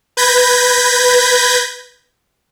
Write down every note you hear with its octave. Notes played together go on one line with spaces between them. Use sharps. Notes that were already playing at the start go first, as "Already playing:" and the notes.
B4 G6 G#6 A#6 B6